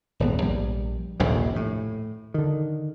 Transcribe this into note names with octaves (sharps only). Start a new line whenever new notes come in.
D#1 G#1 B3
A#1 G3
D#1 A#1 G2 C3
A2
D3 D#3